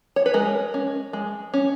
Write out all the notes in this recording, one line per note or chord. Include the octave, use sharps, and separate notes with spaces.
C#5
B4
G#3 A#4
C#4
G#3
C#4